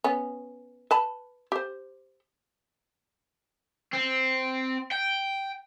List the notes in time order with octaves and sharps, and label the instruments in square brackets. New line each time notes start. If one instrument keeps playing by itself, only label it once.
[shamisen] B3 C#4
B4 A5 B5
G4 C5
[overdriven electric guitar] C4
G5